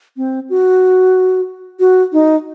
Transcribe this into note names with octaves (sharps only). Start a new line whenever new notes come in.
C4
F#4
F#4
D#4